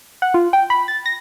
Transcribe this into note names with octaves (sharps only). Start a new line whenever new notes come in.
F#5
F4
G5
B5
A6
A#6